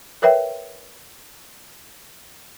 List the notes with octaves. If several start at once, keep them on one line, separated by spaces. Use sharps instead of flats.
A#4 B4 C#5 E5 G5